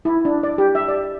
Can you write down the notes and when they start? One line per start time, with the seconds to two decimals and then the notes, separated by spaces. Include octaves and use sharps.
0.05 E4
0.25 D4
0.43 D5
0.58 G4
0.75 E5
0.88 D5